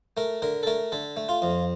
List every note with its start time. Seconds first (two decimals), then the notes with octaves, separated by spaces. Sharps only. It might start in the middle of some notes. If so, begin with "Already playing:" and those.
0.17 A3 A#4
0.42 D3 A#4
0.63 A4
0.67 A3 A#4
0.92 D3 A4
1.17 A3
1.29 F4
1.42 F2